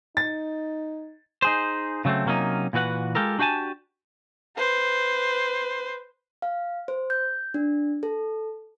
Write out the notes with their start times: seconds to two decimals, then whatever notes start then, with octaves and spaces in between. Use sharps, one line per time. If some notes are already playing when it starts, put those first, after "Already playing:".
0.17 D#4 A6
1.42 D#4 G#4 C5
2.05 C#3 F#3 G3 A3 C4
2.26 C3 F#3 A#3 C#4 D#4
2.73 A#2 E3 F#4 B4 F#5
3.15 G#3 F4 G4 A4 A#4
3.39 D4 F#4 G4 F5 G#5 A5
4.57 B4 C5
6.42 F5
6.88 C5
7.10 G6
7.54 D4
8.03 A4